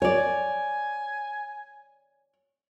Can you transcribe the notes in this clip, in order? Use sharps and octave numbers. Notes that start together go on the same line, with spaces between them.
C#5 D5 G#5